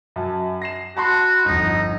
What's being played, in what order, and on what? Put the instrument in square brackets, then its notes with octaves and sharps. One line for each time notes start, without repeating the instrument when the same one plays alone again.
[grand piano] F#2 F#3 A5
A#6 C7 E7
[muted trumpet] F#4 [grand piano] A5 B5 C6
[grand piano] G1 F2 [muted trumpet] D#4